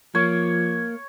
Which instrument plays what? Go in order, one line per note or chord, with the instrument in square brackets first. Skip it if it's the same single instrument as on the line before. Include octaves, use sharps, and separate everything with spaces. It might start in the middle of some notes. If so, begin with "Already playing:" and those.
[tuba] F3 [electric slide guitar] A#3 [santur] C#5